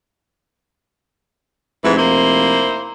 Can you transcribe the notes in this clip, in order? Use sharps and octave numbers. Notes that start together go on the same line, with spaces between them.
F1 G#2 E3 E4
A#3 E4 C5